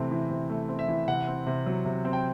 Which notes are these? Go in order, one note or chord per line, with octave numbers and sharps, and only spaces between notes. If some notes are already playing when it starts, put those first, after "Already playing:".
Already playing: C3 E3 A3 C4
E3
C3
A3
C4
E5
E3
C3 F#5
C4
C3
F#3
C3
C4
G5